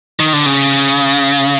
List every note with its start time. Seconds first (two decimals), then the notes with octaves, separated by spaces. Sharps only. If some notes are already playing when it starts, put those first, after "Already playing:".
0.20 D#3
0.33 D3
0.46 C#3